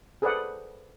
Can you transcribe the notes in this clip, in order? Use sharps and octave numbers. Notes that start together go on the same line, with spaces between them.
G#4 A4 B4 C5 D5 F#5